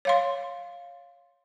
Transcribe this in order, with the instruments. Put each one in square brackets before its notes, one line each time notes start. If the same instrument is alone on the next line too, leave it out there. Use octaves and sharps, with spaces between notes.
[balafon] C#5 F5 C6